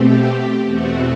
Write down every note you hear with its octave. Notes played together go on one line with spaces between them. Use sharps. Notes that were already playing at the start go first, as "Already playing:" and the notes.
Already playing: B2 A3 C4 G4
E2 B2 A3 C4 F#4